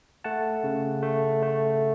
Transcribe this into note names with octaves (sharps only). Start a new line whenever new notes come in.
A3 F#5 A5
C#3
A3
A3